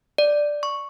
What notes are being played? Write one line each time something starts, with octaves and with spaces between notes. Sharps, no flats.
D5
C#6